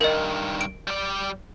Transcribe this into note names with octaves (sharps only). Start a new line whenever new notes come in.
G2 D#3 A#4 D#5
D7
G3 D5